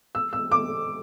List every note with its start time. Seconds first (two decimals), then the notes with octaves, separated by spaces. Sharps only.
0.15 E6
0.33 E6
0.52 D6